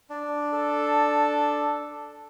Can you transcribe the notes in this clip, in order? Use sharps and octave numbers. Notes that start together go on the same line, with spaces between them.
D4
A4